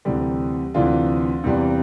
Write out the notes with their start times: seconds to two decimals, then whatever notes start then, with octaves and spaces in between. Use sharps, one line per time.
0.05 D2 C3 E3 G3
0.74 D2 C3 E3 D4 F4
1.44 E2 C3 E3 G3